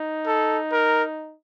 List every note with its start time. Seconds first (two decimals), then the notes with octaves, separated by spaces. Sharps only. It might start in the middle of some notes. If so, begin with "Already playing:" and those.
Already playing: D#4
0.27 A4
0.72 A#4